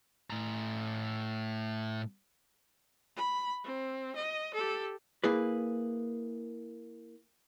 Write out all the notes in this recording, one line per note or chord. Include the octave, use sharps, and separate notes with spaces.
A2 A#5
B5
C4
D#5
G4 A4
A#3 E4 G#4 B4